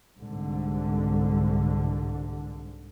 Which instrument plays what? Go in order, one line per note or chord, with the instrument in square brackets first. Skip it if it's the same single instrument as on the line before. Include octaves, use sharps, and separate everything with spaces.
[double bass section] C2 G#2 D3